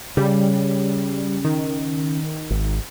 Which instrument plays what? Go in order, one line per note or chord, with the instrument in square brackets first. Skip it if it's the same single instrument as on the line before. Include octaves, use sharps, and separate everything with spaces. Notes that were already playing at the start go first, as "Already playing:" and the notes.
[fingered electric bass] C#3 [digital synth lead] G3
[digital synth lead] D#3
[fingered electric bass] G#1